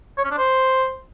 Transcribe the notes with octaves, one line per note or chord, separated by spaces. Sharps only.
C#5
C#4
D4
C5